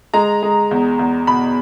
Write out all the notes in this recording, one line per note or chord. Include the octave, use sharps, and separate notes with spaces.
G#3 A#5
G#3
E2
E2
B2 B5